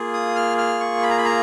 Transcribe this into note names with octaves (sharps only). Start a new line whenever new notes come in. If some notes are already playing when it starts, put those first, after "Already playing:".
Already playing: A#3 F4 G#4
D#6
F6
F6
C#6
B5
A#5
B5
A#5